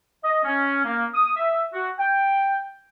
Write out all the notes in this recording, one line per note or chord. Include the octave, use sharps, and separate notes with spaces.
D#5
C#4
A#3
D#6
E5
F#4
G5